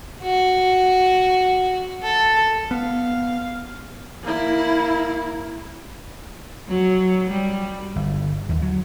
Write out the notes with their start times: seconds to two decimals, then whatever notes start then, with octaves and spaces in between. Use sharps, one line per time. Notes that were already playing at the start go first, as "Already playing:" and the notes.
0.22 F#4
2.02 A4
2.71 B3 F5
4.23 A#3 E4
6.68 F#3
7.31 G3
7.96 G1
8.49 D#2
8.62 F#3